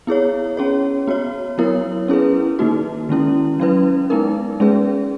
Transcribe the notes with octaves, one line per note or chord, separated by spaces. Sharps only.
B3 E4 G#4 C#5
C#4 G#4 C#5
B3 F#4 C#5
F#3 B3 E4 A#4 C#5
C#4 E4 G#4 B4
D#3 A#3 D#4 F#4
D#3 G#3 C#4 E4
F#3 C#4 E4 B4
G#3 B3 D#4 A#4
G#3 C#4 G#4 B4